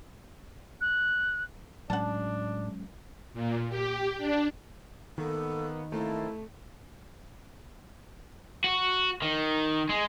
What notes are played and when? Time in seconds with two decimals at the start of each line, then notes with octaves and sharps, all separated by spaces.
0.81 F#6
1.90 A2 F#3 G#3 C#4 D4 F#5 A5
3.34 A#2
3.69 G4
4.18 D4
5.18 D#3 A#3 B3 A4
5.92 A3 A#3 C4 E4 A5
8.64 F#4
9.22 D#3
9.89 G#3